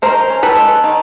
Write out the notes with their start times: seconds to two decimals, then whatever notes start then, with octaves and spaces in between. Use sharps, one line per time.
0.02 D#3 A#4 C5
0.29 C#4
0.43 A4 B4
0.56 G#3
0.84 D#3